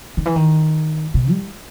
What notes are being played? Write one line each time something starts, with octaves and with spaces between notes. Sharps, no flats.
D#3
E3
D#3
B2
G3